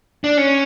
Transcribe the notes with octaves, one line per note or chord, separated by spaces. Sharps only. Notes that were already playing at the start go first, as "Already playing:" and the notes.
D4
C#4